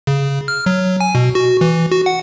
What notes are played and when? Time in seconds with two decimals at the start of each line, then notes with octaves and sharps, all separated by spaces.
0.07 C#3
0.48 F6
0.66 F#3
1.01 G#5
1.15 B2
1.35 F#4
1.61 E3
1.91 F#4
2.06 F#5